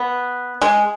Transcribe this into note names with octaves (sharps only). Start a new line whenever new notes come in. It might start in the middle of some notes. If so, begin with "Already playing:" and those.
Already playing: B3
G#3